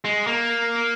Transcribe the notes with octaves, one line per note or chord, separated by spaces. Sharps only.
G#3
A#3